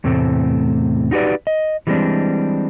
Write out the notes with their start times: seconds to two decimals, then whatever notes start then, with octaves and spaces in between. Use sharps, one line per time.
0.04 E2 A2 C3 A3 C4
1.11 D#4 F#4 G4 B4 D5
1.47 D#5
1.87 E3 G3 G#3 B3 C4 D4